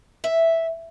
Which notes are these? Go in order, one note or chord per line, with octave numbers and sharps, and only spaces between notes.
E5